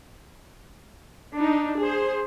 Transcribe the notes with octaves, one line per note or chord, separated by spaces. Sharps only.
D4 D#4
G#4 C5